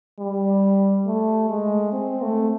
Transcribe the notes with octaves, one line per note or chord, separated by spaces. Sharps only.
G3
A3
G#3
C4
A3